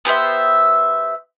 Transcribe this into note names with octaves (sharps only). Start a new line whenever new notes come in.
B3 G4 C5 E5